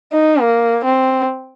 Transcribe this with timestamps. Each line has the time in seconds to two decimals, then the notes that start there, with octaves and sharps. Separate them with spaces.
0.12 D#4
0.40 A#3
0.84 C4